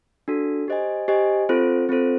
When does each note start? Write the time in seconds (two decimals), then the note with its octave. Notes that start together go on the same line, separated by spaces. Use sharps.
0.28 D4 F#4 A4
0.68 G4 C5 D#5 G#5
1.08 G4 C5 D#5 G#5
1.49 C4 F4 A4 C5
1.89 C4 F4 A4 C5